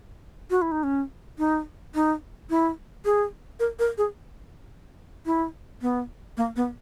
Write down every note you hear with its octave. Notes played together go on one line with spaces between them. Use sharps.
F#4
E4
D#4
C#4
D#4
D#4
E4
G#4
A#4
A#4
G#4
E4
B3
A#3
B3